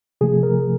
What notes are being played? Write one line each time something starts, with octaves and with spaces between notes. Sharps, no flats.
C3 F3 A3 G#4
A#4